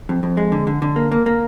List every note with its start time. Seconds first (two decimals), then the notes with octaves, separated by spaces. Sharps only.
0.09 F2
0.23 F2
0.37 G#3
0.52 D3
0.67 D3
0.82 D3
0.96 A#3
1.12 A#3
1.26 A#3